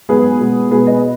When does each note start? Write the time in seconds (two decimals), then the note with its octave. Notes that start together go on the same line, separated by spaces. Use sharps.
0.09 G#2 F#3 B3 G#4 B4
0.40 B2 G#3 B3
0.71 B2 G#3 B3 G#4 B4
0.87 B4 D#5